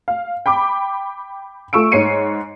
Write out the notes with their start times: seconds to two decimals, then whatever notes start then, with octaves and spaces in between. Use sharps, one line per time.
0.08 F5
0.46 G5 B5 D6
1.73 A3 F4 C#6 E6 D7
1.92 G#2 C#5 C7 C#7 D#7